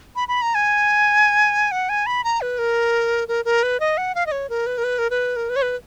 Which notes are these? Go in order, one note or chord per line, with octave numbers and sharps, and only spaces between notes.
B5
B5
A#5
G#5
F#5
G#5
B5
A#5
B4
A#4
A#4
A#4
B4
D#5
F#5
F5
D#5
C#5
A#4
B4
A#4
B4
A#4
B4
A#4
B4
C#5
B4